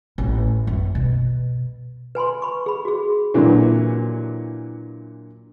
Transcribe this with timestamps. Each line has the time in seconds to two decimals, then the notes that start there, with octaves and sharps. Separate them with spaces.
0.18 A1
0.67 F#2
0.95 B2
2.15 B4 G#5 B5 C6
2.42 B5 C#6
2.66 G#4 B5
2.85 F#4 G#4
3.34 A#2 D3 E3 F#3